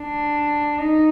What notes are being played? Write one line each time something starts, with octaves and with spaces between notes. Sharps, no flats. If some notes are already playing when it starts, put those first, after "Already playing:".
Already playing: D4
D#4